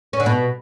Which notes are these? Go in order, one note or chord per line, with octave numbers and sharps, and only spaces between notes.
C#4
D3
B2